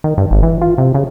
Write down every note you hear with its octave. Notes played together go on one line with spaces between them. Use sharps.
D#3
G2
G#1
E3
F4
C3
C#3